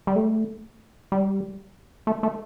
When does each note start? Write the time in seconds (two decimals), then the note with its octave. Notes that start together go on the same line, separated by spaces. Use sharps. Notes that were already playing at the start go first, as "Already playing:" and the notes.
0.07 G3
0.16 A3
1.12 G3
2.07 A3
2.23 A3